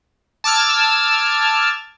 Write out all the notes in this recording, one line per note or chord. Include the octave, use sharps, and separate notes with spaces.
A5 D6 E6 F6 G#6